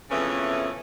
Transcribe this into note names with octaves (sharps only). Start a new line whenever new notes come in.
F2 C#3 E3 A3 B3 C#4